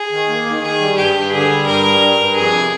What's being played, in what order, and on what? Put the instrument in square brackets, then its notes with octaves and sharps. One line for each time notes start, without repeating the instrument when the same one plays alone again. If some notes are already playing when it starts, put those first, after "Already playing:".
Already playing: [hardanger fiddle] G#4
[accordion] D#3
A#3
D#3
[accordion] D#3 [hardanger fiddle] G#4
[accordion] G3
[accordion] G2 [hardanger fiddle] G4
[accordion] G2
[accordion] D3 [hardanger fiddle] G#4
[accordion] G3
[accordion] G2 [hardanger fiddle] A#4
[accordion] G3
G2
G2
[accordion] F2 [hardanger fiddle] G#4
[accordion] C3